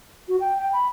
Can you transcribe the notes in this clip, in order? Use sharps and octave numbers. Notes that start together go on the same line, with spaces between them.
F#4
G5
G5
B5